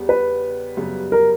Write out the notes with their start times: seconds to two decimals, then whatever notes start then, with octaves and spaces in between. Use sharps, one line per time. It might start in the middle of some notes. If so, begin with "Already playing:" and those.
Already playing: E2 C#3 G3 B3
0.09 B4
0.77 F#2 C#3 G3 B3
1.12 A#4